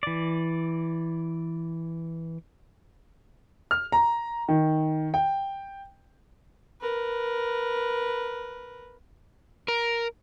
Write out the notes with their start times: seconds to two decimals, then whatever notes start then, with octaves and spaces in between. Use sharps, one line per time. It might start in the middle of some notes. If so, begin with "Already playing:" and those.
0.03 E3 D5
3.71 F6
3.92 A#5
4.49 D#3
5.14 G5
6.81 A#4 B4
9.68 A#4